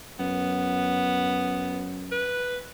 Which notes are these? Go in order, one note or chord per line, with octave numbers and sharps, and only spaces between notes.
F#2 B3
B4